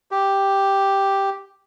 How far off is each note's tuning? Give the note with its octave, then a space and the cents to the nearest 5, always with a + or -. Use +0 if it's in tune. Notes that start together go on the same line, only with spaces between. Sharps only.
G4 +0